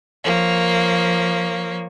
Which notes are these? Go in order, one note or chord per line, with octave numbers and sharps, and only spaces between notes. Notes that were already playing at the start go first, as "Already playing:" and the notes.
F3 A#3 C#5